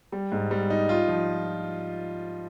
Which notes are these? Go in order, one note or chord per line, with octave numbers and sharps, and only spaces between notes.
G3
G#2
G3
D#4
F4
F3